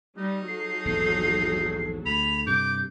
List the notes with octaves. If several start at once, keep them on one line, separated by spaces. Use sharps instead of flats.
G3 D#4
F#3 G#4 A4 C7
A#1 E2 G#2
D2 B5 F7
G2 C3 D6 G6